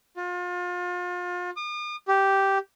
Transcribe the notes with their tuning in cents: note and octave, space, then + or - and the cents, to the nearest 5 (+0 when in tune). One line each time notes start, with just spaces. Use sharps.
F4 +35
D#6 -45
G4 -5